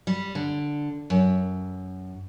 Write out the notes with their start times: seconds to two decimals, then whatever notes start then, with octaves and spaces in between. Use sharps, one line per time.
0.07 G3
0.35 D3
1.10 F#2